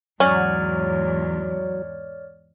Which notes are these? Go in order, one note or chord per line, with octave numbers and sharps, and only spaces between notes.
E2 G#2 F#3 C#4 C#5 D5 F6